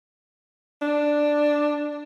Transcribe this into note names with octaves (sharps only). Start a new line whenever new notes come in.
D4